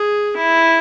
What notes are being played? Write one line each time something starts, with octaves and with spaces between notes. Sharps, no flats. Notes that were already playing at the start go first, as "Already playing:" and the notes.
Already playing: G#4
E4